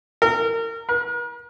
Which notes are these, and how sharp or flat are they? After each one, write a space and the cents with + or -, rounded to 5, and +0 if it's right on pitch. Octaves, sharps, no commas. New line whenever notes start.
A#4 -30
A#4 +45